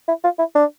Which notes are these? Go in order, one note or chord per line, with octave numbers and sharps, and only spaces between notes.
E4
F4
E4
D4